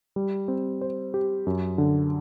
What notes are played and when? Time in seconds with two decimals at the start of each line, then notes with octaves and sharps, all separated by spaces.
0.16 G3
0.48 C4
0.81 C5
1.14 G4
1.47 F#2
1.78 D3